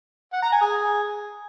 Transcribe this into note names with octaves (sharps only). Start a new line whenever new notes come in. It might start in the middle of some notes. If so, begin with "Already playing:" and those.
F#5
A#5
G#5
G#4